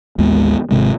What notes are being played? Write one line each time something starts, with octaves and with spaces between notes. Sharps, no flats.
A1 D#2 G#3 B3
G#1 C#2 C3 G#3